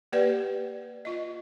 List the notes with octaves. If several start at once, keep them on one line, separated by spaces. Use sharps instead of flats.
A#3 G4 B4 D5 F#5
F4 D#5